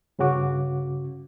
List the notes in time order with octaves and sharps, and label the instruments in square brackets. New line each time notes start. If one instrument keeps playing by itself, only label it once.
[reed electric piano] G2 C#3 C#4 F#4 D6